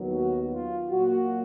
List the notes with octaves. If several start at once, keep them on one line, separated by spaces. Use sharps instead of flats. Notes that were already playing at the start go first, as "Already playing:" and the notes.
Already playing: D#2 D#3 F#3 B3
F#4
F4
A#2 F#3 A#3 F#4